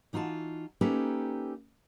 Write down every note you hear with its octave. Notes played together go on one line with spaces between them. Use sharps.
E3 D#4 F4 F#4 A5
A#3 C#4 D#4 G4 A4 B4